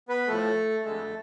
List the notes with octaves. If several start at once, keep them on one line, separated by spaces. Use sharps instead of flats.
B3 B4
A2 F3 A3 A4
F2 D3 G#3 A3 A4